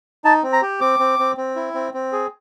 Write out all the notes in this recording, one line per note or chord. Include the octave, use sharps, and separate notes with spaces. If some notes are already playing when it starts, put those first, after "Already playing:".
D#4 A5
C4
A#5
G4
C4 D6
C4
C4
C4
E4
C4
C4
G#4